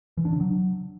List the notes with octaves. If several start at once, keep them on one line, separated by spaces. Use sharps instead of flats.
E3
D4
C#3
F#3